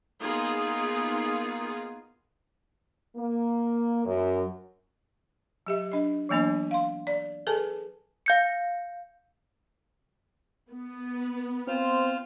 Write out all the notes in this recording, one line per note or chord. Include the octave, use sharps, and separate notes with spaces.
A#3 B3 D#4 F4 G#4
A#3
F#2
F#3 G4 E5
D4 D#5
E3 F#3 A#3 B3 D4
F5 C6
D5
G#4 A4 B4 G#5 A5
F5 G6 C#7
B3
C4 F4 C5 F6